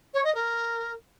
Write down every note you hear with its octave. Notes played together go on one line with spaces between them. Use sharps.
C#5
D#5
A#4